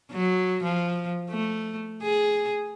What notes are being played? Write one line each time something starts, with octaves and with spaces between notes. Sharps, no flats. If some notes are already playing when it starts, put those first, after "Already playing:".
F#3
F3
A3
G#4